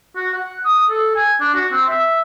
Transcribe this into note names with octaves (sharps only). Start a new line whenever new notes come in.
F#4
F#5
D#6
A4
G#5
D4
F#4
C4
E5